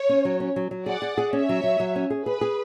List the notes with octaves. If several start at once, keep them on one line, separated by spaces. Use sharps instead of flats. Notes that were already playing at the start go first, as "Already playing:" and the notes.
Already playing: C#5
C#4
F#3
C#4
F#3
F#3
G#4 D5 F#5
G#4
G#4
C#4 C#5 E5
F#3
F#3
F#3
C#4
G#4
G#4 B4
G#4